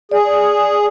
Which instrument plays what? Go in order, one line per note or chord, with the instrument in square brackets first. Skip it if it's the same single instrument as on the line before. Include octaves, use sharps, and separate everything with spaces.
[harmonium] G#4 [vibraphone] D5